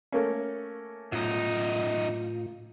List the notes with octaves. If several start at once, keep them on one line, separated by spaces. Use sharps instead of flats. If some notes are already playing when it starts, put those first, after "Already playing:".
A3 A#3 C#4
F#2 A2 D#4 F4